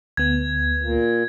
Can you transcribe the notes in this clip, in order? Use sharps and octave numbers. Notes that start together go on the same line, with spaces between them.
D2 B3 G#6
A#2